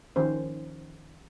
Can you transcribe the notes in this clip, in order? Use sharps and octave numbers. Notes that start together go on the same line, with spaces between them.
D#3 F3 C#4 C5